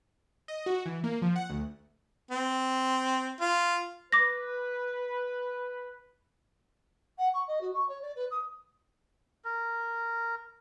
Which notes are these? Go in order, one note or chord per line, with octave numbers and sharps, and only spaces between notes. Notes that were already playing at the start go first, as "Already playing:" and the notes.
D#5
F#4
E3
A#3
F3
F#5
D2
C4
F4
B4 D6 A#6
F#5
C#6
D#5
F#4
C#6
C#5
D5
B4
D#6
A#4